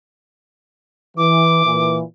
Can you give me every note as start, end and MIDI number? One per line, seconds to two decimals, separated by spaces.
1.17 1.62 52
1.17 1.96 86
1.65 2.02 46
1.65 2.02 52